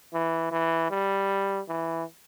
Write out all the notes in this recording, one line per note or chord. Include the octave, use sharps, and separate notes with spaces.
E3
E3
G3
E3